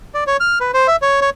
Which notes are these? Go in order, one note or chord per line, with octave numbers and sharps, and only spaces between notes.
D5
C#5
F6
B4
C5
E5
C#5
C#5